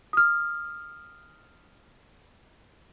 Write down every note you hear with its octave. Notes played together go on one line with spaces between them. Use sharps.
D#6 F6